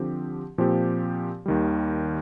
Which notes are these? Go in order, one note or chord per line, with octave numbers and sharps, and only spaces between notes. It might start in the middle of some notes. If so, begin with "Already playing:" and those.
Already playing: D3 F3 C4 G4
A#2 F3 C4 G4
D#2 D#3 G3